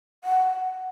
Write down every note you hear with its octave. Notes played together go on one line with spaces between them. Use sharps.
F#5